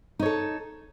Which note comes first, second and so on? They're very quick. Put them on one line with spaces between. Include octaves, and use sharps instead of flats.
D#4 C#5 A4